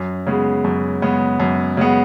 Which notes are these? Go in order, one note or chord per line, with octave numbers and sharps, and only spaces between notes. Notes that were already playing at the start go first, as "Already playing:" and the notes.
Already playing: F#2
C#3 G#3 B3
F#2
C#3 G#3 B3
F#2
C#3 G#3 B3